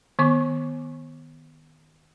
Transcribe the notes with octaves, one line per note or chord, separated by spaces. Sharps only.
D#3 B3 C#6 D6